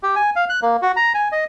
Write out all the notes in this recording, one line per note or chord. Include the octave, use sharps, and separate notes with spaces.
G4
G#5
F5
F#6
A#3
F#4
A#5
G#5
D#5